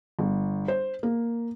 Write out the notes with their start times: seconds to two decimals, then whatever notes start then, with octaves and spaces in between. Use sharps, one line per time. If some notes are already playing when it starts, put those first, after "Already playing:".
0.19 G1
0.68 C5
1.03 A#3